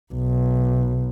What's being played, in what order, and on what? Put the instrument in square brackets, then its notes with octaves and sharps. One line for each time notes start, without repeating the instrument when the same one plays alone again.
[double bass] B1